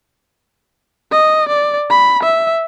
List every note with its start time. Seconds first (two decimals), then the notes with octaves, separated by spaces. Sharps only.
1.12 D#5
1.49 D5
1.90 B5
2.23 E5